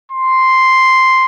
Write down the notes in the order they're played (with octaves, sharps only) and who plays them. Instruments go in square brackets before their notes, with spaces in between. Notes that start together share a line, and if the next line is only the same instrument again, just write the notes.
[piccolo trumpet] C6